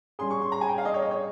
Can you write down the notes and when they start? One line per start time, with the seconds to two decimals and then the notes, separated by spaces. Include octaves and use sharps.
0.19 G3 C#4 G#4 C6
0.30 C#6
0.41 C6
0.52 A#5
0.61 G#5
0.69 G5
0.78 F5
0.85 D#5
0.94 C#5
1.02 D#5
1.11 C#5